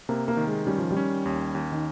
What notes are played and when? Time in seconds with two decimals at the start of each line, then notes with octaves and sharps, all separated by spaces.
0.09 C3 A#3
0.28 A#3
0.37 D#3
0.47 G#3
0.66 G3 C#4
0.78 F3
0.91 G3
0.97 C#4
1.26 D#2
1.55 D#2
1.72 D#3